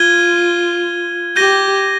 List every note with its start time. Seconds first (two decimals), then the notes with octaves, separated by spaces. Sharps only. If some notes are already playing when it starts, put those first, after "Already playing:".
Already playing: F4 G#6 D#7 G7
1.36 G4 G6 A#6 D#7 G7